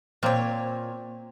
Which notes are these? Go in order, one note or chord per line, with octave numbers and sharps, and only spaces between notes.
A#2 A#3 C4 C#5